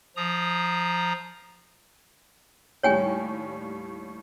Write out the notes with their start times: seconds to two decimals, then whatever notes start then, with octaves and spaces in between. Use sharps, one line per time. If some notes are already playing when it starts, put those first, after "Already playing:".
0.16 F3 A#5 D#6
2.83 D#2 A2 G3 C#5 G5 G#5